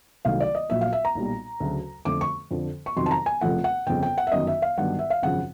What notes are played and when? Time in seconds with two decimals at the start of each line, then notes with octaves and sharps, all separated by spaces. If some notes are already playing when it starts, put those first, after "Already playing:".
0.25 C2 C3 D#3 F#3 A3 F5
0.40 D5
0.55 D#5
0.70 A#1 A#2 F#3 E5
0.81 F5
0.93 E5
1.05 A#5
1.15 B1 A#2 G3
1.60 D2 C#3 F#3
2.05 F2 D3 F3 A3 D6
2.21 C#6
2.51 F2 D3 F3
2.86 C#6
2.96 F2 C3 D#3 F#3 C6
3.06 A5
3.11 A#5
3.26 G#5
3.41 F1 F2 C#3 F3 A3 F#5
3.64 F#5
3.87 G1 F2 C#3 G5
4.03 G5
4.18 F#5
4.27 E5
4.32 G1 F#2 D#3 D#5
4.47 E5
4.62 F5
4.77 G1 G2 D#3 F#3 F#5
4.99 E5
5.10 F5
5.23 G#1 F#2 C#3 F3 F#5